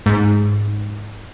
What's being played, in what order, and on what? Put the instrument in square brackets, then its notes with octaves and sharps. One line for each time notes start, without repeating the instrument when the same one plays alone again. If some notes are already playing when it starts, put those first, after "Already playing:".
[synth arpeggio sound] G#2